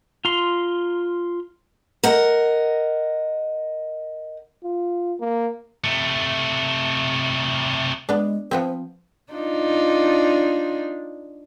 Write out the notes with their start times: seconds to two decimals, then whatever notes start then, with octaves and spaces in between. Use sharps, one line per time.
0.25 F4 A#5 C6
2.04 A#4 D#5 F#5
4.64 F4
5.20 A#3
5.84 C3 A3
8.09 G#3 B3 D4
8.51 F3 B3 C4 C5
9.33 D4 D#4 F4